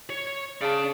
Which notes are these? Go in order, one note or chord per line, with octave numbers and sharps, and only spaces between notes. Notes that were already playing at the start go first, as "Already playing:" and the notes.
C#5
C#3 D5 A5